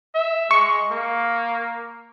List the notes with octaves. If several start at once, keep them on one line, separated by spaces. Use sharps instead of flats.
E5
G#3 C#6
A#3